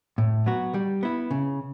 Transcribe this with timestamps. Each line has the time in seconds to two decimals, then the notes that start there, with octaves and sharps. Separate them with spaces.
0.18 A2
0.46 F#3 B3 F#4
0.74 G3
1.03 B3 E4
1.31 C#3